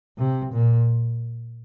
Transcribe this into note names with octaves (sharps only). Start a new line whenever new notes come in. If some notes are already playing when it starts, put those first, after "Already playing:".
C3
A#2